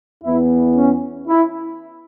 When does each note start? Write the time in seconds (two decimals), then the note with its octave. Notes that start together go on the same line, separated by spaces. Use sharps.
0.22 E2 E3 B3 E4
0.75 C#4
1.28 E4